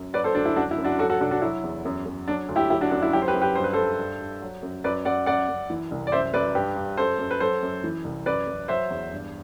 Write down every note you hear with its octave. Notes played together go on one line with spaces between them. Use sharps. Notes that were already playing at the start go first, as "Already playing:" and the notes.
Already playing: F#2
F#3 B4 D5
A4 C5
D2 D4
E4
F#2 D4 F#4
E4
F#2
D4 F#4
F#3 F#4 A4
F#4 A4
C2 D4 F#4
D4 F#4
F#3 E4
E2
F#2
F#2
F#3 D4
D2
E4 G4
F#3 E4 G4
D4 F#4
F#2 D4
E4
F#3 E4 G4
C5
G4 B4
F#2
G4 B4
G2 C5
B4
G2 A4 C5
G2
G2
F#3
F#2
F#2 B4 D5
F#2 D5 F#5
F#2 D5 F#5
F#2
E3
C2
D5
F#2 C5 E5
F#2 B4 D5
G2 G4 B4
G2
F#2 A4 C5
F#2
B4
F#3 A4 C5
F#2
E3
C2
F#2 B4 D5
F#2
F#3 C5 E5
E2
G2